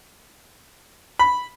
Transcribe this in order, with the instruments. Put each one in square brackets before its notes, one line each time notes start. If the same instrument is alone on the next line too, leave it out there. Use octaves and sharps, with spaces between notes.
[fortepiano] B5